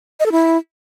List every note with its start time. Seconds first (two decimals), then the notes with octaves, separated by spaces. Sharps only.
0.20 D#5
0.26 A4
0.32 E4